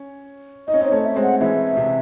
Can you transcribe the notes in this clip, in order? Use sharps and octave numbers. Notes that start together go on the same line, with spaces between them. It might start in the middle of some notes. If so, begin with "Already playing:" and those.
Already playing: C#4
D#4 D#5
C#4
C4 D#4 C#5
A3 C#4
E5
G#3 C4
F#5
E3 G#3 E5
C3